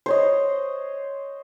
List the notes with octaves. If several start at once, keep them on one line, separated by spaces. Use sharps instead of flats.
C5 C#5 D#5